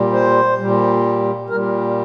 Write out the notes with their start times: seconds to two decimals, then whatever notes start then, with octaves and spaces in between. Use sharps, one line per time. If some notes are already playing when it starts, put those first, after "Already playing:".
Already playing: A#2 G3
0.13 C5
0.59 A#2 G3
1.49 A#2 G3 A#4